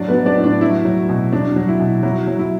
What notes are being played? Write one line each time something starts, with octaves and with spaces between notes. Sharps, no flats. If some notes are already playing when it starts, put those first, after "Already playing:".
Already playing: A2 F#3 D4 D5
B3 B4
F#3
D4 D5
A2
D4
F#3 E4
F#3
B2
F#3 D4
F#3
E4
B2
F#3 E4
F#3
E4